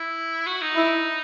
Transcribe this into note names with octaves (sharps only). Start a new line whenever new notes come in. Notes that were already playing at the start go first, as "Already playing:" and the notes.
Already playing: E4
F#4
D#4
E4